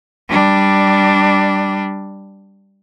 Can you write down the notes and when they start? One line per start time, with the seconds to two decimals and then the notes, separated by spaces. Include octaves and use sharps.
0.29 G3 D4